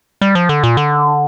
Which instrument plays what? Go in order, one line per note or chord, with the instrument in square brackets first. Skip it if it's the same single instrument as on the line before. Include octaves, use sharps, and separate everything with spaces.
[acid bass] G3
F3
D3
A#2
D3